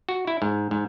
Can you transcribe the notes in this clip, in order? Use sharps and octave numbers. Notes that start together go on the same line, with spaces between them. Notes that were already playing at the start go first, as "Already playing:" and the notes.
F#4
E4
G#2
G#2